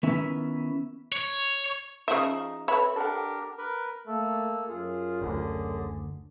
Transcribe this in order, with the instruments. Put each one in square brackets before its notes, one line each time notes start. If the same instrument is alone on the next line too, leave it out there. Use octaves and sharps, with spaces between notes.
[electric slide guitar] D#3 B3 C#4 E4 E5 G#5
[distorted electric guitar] C#5
[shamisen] C#3 F3 E5 [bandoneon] D#4
[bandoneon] C4 [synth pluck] A4 B4 [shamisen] C#5 E5 B5
[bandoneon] D4 G4 A#4 [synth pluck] A4 F#5
[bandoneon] A#4 B4
[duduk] A3 [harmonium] A#3 A4
[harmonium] F#2 G#4 [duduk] F4
[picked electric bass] F#1 D2 [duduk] D3